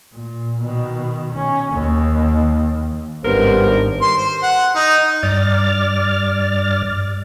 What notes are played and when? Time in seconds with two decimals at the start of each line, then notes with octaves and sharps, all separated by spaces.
0.13 A#2
0.62 B2 D#3
1.35 C#4
1.73 D#2 A#3
3.25 G#1 G2 C3 B3 A#4 C5
4.02 C6
4.18 C5
4.43 F#5
4.75 D#4
5.23 G2 D5 F6 A6